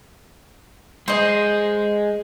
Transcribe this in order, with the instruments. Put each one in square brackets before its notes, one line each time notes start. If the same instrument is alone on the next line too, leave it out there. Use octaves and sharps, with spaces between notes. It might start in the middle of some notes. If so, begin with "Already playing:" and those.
[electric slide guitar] G#3 G#4 [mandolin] C5 D#5